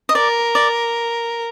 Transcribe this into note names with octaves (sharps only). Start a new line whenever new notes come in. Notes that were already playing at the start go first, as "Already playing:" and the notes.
D#5
A#4 D5
D5